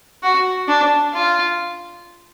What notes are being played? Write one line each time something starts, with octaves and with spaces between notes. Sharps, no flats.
F#4
D4
F4